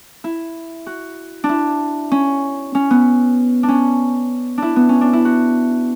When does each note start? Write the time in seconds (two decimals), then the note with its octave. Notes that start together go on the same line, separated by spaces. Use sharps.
0.24 E4
0.86 F#4
1.44 D4
1.49 E4
2.12 C#4
2.75 C#4
2.90 B3
3.63 D4
3.69 C#4
4.58 D4 E4
4.76 B3
4.89 C#4
5.01 D4
5.13 E4
5.25 F#4